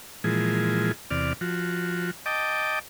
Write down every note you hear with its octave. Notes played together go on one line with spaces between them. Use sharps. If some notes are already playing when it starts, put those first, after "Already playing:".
A#2 E3 F3 G#3 G#4
E2 C3 D5 F6
F3 F#4
D#5 G5 A5 D6